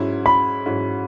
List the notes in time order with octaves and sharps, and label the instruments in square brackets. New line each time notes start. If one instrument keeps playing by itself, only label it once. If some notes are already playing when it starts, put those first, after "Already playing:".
Already playing: [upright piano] G#2 F#3 C#4 E4
[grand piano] B5
[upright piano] G#2 F#3 C#4 E4